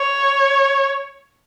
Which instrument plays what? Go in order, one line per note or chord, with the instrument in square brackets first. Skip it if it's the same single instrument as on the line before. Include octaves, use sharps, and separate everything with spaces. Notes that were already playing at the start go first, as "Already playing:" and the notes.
Already playing: [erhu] C#5